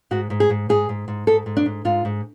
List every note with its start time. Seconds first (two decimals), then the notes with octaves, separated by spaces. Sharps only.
0.11 G#2 F#4
0.30 G#2
0.40 G#4
0.50 G#2
0.69 G#2 G#4
0.89 G#2
1.08 G#2
1.27 G#2 A4
1.46 G#2
1.57 D4
1.66 G#2
1.85 G#2 F4
2.05 G#2